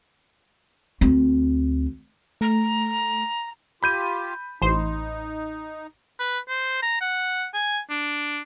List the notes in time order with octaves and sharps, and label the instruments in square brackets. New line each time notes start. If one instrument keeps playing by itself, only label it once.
[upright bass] D2 C4
[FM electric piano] A3 [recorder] A#5
[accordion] F4 G4 [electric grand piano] B5 G6 D#7
[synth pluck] A1 C5 [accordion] D#4
[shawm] B4
C5
A#5
F#5
G#5
D4